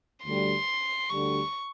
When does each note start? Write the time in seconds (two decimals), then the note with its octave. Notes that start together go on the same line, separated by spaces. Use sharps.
0.25 D2 D3 G3 C6
1.09 D2 D3 G3 C#6